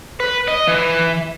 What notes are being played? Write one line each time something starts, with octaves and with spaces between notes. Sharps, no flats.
B4
D#5
E3